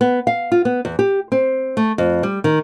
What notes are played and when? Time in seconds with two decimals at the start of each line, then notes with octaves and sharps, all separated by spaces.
0.01 B3
0.27 F5
0.52 F4
0.65 B3
0.85 E2
0.99 G4
1.32 C4
1.77 A3
1.98 F2
2.23 G3
2.44 D#3